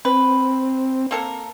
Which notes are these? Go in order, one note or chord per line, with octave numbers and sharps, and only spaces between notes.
C4 B4
A#3 A4 A#4